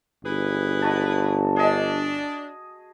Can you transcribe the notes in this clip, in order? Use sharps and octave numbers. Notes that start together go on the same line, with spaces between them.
G1 E4 G#4 B4
F#4 A5
D4 G#4 D#5